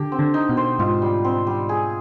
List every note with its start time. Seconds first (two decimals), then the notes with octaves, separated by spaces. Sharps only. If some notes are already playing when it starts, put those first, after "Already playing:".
Already playing: D3 G4
0.12 C4
0.19 D3
0.34 D#4
0.49 B2
0.57 C5
0.79 G#2 F4
1.02 G3
1.25 C4
1.47 G3
1.69 G#4